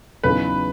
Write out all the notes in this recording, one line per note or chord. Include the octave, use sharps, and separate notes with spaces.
E2 C#3 F#3 B3 D#4 B4